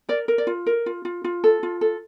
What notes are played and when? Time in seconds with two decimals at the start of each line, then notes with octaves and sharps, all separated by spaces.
0.09 A#4 D5
0.28 A#4
0.38 D5
0.47 F4
0.66 A#4
0.86 F4
1.05 F4
1.24 F4
1.44 A4
1.63 F4
1.81 A4